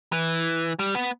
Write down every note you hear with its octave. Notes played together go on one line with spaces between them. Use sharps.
E3
G3
B3